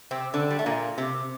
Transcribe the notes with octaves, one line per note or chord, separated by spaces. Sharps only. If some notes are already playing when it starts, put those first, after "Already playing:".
C3 C4
D3 D4
G3
A3
A#2 A#3
C3